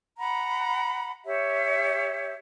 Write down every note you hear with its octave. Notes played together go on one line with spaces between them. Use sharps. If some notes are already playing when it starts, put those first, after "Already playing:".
F#5 A#5 B5
G4 C#5 E5